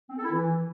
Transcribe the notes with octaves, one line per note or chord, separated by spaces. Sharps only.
C4
A4
E4
E3